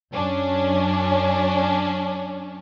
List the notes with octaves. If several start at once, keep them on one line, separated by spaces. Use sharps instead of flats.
F#2 C#4 D4